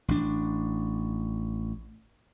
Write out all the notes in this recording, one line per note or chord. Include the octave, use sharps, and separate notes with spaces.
A1 D4